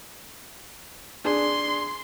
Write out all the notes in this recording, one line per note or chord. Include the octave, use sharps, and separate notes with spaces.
D4 G#4 C6